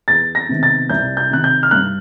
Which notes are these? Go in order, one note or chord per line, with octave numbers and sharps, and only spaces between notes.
E2 A6
A#6
C3 D#3 G#3 B3
A6
C2 G6
G6
C3 D#3 F#6
G6
F6
G2 F#6